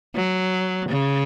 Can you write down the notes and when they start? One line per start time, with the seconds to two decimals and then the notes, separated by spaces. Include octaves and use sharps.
0.15 F#3
0.89 C#3